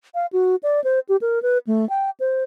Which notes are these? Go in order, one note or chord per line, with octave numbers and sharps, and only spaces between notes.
F5
F#4
D5
C5
G4
A#4
B4
A3
G5
C5